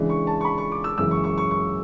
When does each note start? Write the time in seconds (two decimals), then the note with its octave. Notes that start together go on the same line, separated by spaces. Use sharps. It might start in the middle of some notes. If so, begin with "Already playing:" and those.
Already playing: C#3 E3 G#3 D4
0.10 C#6
0.27 A5
0.41 C#6
0.45 B5
0.58 C#6
0.72 D6
0.84 E6
0.98 F#2 C#3 E3 G#3 E6
1.11 C#6
1.24 C#6
1.38 C#6
1.51 C#6